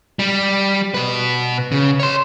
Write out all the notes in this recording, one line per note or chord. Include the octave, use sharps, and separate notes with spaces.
G3
B2 B4
C#3
C#5 C6